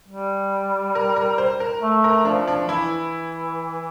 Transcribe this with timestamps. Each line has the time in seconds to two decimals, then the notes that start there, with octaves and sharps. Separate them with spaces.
0.08 G3
0.95 A#4
1.16 A#4
1.38 C5
1.60 A#4
1.82 A3
2.04 A#4
2.25 F3 D4
2.48 D4
2.68 E3 E4